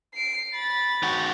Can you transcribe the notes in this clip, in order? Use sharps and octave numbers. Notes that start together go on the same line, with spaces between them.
C7 D7
B5 A6
D#3 F#4